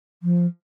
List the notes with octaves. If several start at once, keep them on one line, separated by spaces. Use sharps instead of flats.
F3